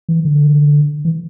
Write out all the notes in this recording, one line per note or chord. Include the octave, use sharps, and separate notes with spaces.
E3
D3
E3